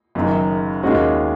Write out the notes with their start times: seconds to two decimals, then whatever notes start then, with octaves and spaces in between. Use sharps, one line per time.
0.15 F#1 F#2 D#3
0.83 D#2 D#3 G#3 C#4 F#4